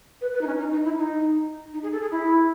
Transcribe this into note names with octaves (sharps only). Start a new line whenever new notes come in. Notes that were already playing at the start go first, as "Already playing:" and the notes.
B4
B4
D#4
C#4
D#4
D#4
E4
D#4
D#4
G#4
A4
G#4
E4